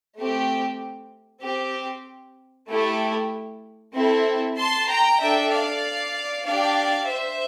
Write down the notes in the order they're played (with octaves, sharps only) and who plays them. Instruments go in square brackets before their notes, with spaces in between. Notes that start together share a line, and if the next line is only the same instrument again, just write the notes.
[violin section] A3 C4 G4
C4 G4
A3 E4 G4
C4 E4 A4
A5 C6
G5 A#5
D4 A4 E5 G5
D5 F5
D4 G4 D5 F5
C5 E5